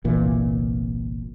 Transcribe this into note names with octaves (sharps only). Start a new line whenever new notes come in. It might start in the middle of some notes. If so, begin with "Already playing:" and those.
G1 C2 A#2 E3